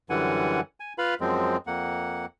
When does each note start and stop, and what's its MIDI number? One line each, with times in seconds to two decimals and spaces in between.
0.10 0.60 42
0.10 0.60 50
0.10 0.60 52
0.10 0.60 55
0.10 0.60 78
0.10 0.60 80
0.80 0.93 80
0.98 1.14 65
0.98 1.14 71
0.98 1.14 77
0.98 1.14 83
1.21 1.57 42
1.21 1.57 53
1.21 1.57 56
1.21 1.57 60
1.67 2.26 41
1.67 2.26 58
1.67 2.26 78